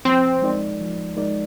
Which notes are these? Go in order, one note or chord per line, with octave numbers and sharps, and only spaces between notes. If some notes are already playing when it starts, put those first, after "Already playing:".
F3 C4
G#3 D#4 A#4 D5
F3
G#3 D#4 A#4 D5